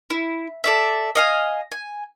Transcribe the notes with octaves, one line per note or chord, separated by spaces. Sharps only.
E4
A4 D5 E5
D#5 F5 G#5
G#5